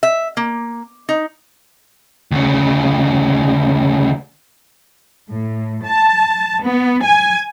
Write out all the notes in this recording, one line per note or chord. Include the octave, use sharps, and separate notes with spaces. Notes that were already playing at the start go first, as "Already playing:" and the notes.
E5
A#3
D#4
D2 C#3
A2
A5
B3
G#5